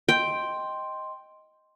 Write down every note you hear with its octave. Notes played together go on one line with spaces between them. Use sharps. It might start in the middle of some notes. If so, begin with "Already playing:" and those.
D#5 G5 C6